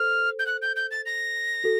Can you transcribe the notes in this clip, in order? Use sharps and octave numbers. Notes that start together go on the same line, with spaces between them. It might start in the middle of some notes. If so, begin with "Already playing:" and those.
Already playing: A4 C5 F6
G6
F#6
G6
G6
A6
A#6
F#4 A4